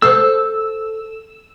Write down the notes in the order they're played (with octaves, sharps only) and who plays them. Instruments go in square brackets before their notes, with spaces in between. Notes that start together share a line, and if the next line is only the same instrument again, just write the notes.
[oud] A4 C5 [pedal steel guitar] E6